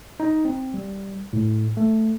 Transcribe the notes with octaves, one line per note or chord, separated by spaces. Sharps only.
D#4
C4
G3
A2
A3